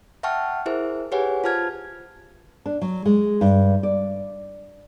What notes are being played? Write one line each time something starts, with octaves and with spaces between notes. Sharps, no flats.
E5 F#5 G5 A5 C#6 F6
E4 G#4 A#4 C5 E5
G4 G#4 B4 C#5 F#5 G#5
F4 C5 A5 F6 G#6
D4
F#3
G#3
G2
D5